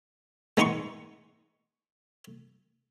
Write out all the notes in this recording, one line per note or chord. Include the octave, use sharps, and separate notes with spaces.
G#3 B3 D#4 C6 C#6